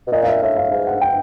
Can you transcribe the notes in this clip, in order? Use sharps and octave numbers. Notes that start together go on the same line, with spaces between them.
B2
A#2 D#5
F5
E5
A2 E5
F5
G#2 F5
F#5
G5